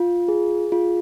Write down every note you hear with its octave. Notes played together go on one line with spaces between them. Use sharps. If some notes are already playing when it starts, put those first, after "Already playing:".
Already playing: F4
G#4
F4